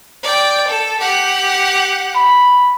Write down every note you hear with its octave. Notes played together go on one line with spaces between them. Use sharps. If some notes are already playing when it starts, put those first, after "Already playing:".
D5 G5
A4
G4 F#5
B5